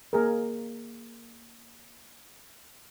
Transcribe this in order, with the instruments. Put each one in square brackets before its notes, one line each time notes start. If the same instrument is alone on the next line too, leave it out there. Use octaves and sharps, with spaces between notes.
[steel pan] A#3 G#4 A#4